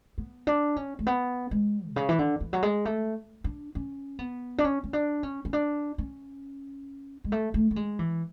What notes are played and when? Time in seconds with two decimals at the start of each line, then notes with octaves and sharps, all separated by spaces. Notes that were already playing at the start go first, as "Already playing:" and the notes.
0.18 B3
0.47 D4
0.76 C#4
0.99 A3
1.07 B3
1.51 G#3
1.90 B2
1.96 C#3
2.09 E3
2.19 D3
2.40 E3
2.53 F#3
2.63 G#3
2.85 A3
3.44 D4
3.75 C#4
4.19 B3
4.58 D4
4.64 C#4
4.84 C#4
4.93 D4
5.23 C#4
5.45 C#4
5.53 D4
5.98 C#4
7.24 G#3
7.32 A3
7.54 A3
7.71 A3
7.76 G#3
7.99 E3